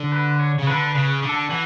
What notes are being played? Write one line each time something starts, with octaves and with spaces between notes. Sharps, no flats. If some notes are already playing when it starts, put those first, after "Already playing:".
Already playing: D3
B4
C#5
C#3
D3 B4
B4
C#3
D3
A4
E3 F#4